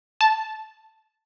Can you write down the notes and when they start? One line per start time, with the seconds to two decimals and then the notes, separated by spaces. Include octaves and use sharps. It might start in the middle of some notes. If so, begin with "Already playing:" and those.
0.21 A5